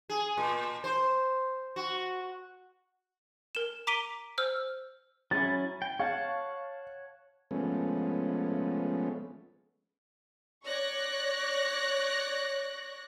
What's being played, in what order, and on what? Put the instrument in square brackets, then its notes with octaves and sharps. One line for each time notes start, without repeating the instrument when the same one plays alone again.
[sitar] G#4
A#2
C5
F#4
[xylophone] A#4 E7
A#5 D6 B6 D7 D#7 G7
C5 E6 F6
[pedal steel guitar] F#3 C#4 E4 [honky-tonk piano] A6
[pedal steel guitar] G5
[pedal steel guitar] C#5 F#5 A5 [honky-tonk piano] F5
[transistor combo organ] F3 G#3 A3 B3 C#4
[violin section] C#5 D5 C#6 F#6 A#6